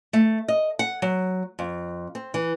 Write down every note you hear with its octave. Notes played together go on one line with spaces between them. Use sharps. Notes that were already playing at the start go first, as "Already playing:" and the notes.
A3
D#5
F#5
F#3
F2
C4
E3